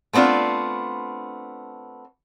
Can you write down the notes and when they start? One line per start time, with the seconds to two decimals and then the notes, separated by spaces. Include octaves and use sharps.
0.13 A3 B3 C4 D4 F4